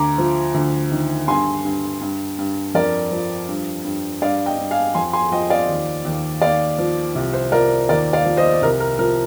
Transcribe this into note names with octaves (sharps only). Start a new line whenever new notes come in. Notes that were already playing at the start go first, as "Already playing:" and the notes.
Already playing: D2 A#5 D6
F3
D2
D#3
G2 G#5 C6
G2
G2
G2
F2 A#4 D5
F3
G2
G2
G2 D5 F5
D#5 G5
G2
F5 G#5
F2 G#5 C6
G#5 C6
F3 D#5 G5
D5 F5
D#2
D#2
D#2 D5 F5
F3
C2
C5
F3 A#4 D5
D#2 A#4 D5
D5 F5
F3
C5 D#5
C2 A#4
A#4
F3 A#4